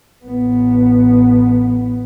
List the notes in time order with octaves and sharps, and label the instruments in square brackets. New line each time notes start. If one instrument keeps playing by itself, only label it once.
[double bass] A1 B3